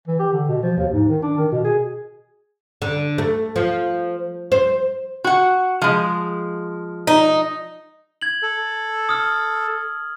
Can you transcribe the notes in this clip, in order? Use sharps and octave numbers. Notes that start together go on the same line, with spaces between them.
E3
G4
D3
B2
F3
D#2
G#2
D#3
D4
D#3
B2
G#4
D3
A3
F3
C5
F#4 F#5
F3 G#3
D#4
G#6 F#7
A4
D#6 F6